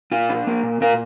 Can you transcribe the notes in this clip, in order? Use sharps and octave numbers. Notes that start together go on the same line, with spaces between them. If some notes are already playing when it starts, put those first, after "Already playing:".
A#2 F4
D4
A#3
A#2
A#2 F4 A#4